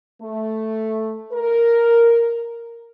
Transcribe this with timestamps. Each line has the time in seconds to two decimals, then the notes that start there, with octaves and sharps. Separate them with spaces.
0.22 A3
1.33 A#4